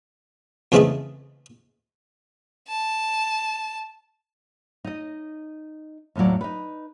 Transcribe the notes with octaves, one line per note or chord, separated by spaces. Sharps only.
F2 C#3 E3 G#3 A3 G#4
A5
D#4 D#5
D#2 A2 C#3 F#3 D5
D#4 B4